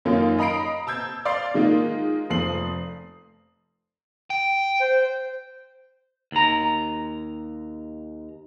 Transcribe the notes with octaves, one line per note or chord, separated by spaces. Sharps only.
F#2 D#3 A#3 C#4 D#4 F4
D#5 A#5 B5 C7 D7
A5 E6 G6 G#6
D5 F5 C6 D6 C7
D#3 G#3 A#3 D#4 F4
F1 F3 D#6 C7 F#7
G5
C5
D#2 A#5